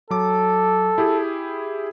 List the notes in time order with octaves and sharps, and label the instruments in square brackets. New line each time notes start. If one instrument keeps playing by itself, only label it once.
[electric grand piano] F#3 D6 [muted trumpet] A4
[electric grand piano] E4 G4 G#4